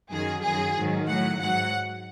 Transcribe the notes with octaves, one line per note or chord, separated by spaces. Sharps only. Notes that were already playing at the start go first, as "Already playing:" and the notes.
F#2 D#3 F#3 G#4
F#2 D#3 F#3 G#4
G#2 D#3 F#3
A2 F#3 F#5
G#2 F#3 F#5